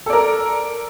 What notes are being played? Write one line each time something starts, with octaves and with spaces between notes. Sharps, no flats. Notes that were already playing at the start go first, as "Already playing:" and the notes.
A4 A#4 D5